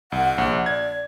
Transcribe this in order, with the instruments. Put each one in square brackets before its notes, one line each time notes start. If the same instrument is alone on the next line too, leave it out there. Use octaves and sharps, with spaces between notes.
[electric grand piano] C2 [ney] F#5
[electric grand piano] A#1
[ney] D5 [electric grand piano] G#6